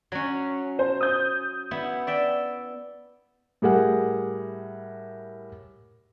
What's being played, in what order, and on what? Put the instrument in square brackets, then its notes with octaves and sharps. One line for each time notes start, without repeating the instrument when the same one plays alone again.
[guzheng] F#3 C#4
[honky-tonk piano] C5
D#6 G6
[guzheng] B3 E4
D5 E5 G5
[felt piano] A2 G3 G#4 A#4 F#5